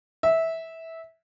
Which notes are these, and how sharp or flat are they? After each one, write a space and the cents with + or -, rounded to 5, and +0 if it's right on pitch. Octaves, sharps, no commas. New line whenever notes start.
E5 -15